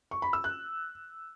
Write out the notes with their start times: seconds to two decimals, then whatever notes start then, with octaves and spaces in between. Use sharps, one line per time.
0.11 C#6
0.22 B5
0.33 E6
0.44 F#6